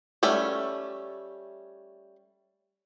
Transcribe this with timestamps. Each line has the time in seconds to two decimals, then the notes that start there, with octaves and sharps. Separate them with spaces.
0.23 G3 A3 C#4 E5